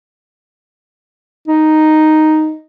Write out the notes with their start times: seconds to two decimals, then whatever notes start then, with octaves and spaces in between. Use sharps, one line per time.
1.48 D#4